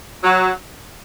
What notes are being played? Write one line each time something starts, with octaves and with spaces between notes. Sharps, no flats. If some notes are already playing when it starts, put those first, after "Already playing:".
F#3